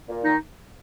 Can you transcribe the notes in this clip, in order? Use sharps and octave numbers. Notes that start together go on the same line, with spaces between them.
A#2
D#3 D#4